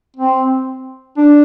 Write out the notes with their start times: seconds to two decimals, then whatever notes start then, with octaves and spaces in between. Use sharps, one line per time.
0.17 C4
1.18 D4